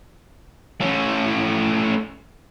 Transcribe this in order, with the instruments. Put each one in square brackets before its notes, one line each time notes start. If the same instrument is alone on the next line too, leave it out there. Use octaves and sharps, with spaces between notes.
[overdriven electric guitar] A3 C#4